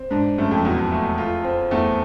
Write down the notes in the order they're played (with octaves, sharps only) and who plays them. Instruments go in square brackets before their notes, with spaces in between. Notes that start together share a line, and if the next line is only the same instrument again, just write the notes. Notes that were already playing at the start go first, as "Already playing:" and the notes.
Already playing: [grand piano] C4
[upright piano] G#2 [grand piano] D4
[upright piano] F#2 [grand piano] A3
[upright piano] F2
[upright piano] E2 [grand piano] B2
[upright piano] F2
[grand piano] A3
F4
C4
[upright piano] E2 [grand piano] A3